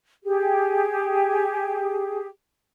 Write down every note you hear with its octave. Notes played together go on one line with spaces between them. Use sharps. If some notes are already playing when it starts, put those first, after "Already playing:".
G4 G#4